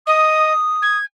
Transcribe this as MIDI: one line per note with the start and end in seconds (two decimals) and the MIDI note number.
0.07 0.53 75
0.07 0.98 87
0.82 1.05 92